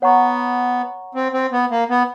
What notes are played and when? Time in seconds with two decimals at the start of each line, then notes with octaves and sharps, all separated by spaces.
0.02 B3 C#5 F#5 A#5 C#6
1.15 C4
1.33 C4
1.52 B3
1.71 A#3
1.90 B3